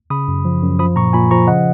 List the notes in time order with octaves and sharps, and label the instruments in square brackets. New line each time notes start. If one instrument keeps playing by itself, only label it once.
[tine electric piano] C#3 B5 D#6
F#2
F3
F#2
F3 B5 D#6
A#2 A#5 C#6
A#2 G#5 B5
F3 A#5 C#6
C#3 D#5 F#5